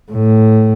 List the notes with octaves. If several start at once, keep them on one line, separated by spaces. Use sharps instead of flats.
A2